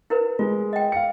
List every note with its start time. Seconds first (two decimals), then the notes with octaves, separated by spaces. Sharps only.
0.10 E4 A#4 B4
0.39 G#3 F4
0.73 D#5 G5
0.92 F5 C#7